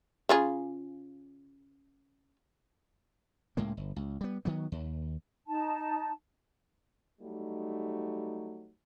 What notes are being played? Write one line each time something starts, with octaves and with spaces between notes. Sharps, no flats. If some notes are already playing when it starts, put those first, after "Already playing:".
C#3 F4 G#4
C#2 A2 G#3 A#3
G1
C#2
G3 B3
D#3 F#3 B3
D#2
D#4 A5
F#3 G3 A3 D#4